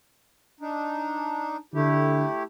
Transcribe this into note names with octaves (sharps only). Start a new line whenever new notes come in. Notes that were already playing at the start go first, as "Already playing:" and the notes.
D4 D#4
D3 A3 E4 G4